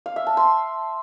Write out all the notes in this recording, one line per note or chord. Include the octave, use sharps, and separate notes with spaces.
F5
E5
A5
C6